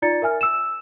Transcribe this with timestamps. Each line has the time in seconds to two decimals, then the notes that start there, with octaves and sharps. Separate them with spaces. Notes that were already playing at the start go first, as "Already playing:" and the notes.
0.02 D#4 F4 D5 A#5 A6 C#7
0.22 A#4 E5 G#5 F6
0.41 E6 E7